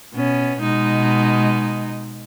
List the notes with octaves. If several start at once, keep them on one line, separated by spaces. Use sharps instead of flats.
B2 B3 C#4
B2 G#3 D#4